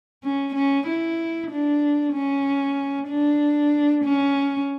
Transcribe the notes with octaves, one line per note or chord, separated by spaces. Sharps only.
C#4
C#4
E4
D4
C#4
D4
C#4